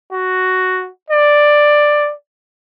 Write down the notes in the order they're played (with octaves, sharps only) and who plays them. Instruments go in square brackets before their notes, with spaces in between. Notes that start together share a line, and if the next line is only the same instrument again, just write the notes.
[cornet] F#4
D5